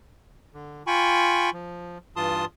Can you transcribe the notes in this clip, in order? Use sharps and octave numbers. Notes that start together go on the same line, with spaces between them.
D3
F4 G5 G#5 B5 C#6
F3
G2 E3 F4 A5 C6 D#6